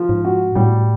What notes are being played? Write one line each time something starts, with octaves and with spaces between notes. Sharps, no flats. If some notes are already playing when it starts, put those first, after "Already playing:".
Already playing: F3
G#2
F#4
A2 G3